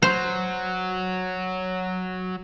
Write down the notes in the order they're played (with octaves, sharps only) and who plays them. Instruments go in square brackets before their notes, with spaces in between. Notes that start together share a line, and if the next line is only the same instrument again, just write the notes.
[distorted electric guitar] F#3 [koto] C5